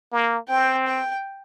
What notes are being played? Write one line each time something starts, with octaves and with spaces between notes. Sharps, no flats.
A#3
C4 G5
G5